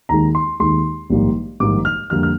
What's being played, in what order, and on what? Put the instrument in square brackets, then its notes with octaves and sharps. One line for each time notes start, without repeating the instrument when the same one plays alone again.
[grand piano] D#2 D#3 G#3 A#5
C6
D#2 D#3 G#3 C6
A#1 G#2 D#3 G3 A#3
A#1 G#2 D#3 G3 A#3 D6
F6
F2 D3 G3 A#3 F6
F6